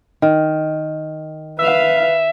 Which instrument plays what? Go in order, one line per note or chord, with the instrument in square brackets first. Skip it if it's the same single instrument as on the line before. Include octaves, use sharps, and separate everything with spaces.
[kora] D#3
[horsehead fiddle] B4 F5 [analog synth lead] E5